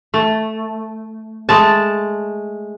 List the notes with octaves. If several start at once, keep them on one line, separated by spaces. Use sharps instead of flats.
A3
G#3 A3 A5